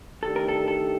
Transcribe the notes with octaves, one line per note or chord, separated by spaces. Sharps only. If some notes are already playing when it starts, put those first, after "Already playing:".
D#3 A3 D4 G4 A4
A#4
A4
A4